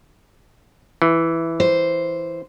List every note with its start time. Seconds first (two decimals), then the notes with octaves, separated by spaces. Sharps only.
1.02 E3
1.60 C5